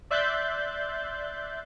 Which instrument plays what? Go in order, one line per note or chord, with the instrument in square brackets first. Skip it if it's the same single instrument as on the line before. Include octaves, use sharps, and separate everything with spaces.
[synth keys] D5 E5 C6 F#6 G6 A6